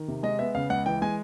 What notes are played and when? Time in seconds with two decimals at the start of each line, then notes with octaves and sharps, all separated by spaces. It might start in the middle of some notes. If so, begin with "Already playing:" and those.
Already playing: D#3
0.08 C3
0.23 G#3 D#5
0.39 B3 E5
0.55 C#3 F5
0.70 C#2 F#5
0.86 E3 G5
1.02 G#3 G#5